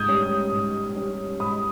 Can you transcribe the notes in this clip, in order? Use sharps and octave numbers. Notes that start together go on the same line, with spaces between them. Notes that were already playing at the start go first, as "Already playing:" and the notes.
Already playing: G#2 D#6 G6 G#6
G3 C#4
G#2
G3 C#4
G#2 B5 D#6